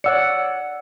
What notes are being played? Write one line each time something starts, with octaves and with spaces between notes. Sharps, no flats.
C#5 D5 F#5 E6 C#7